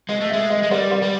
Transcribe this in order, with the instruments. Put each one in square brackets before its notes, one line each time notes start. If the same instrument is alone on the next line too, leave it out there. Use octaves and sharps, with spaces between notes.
[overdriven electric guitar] G#3 [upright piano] D#5
[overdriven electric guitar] A3
[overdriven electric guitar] G#3 [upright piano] E5
[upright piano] D#5
[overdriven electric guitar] G#3
[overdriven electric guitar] G3 [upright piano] D5
[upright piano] D5
[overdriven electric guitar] G3